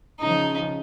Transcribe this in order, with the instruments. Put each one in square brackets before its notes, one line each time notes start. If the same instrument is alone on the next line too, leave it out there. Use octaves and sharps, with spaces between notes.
[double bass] C#3 F3 [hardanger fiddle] D#4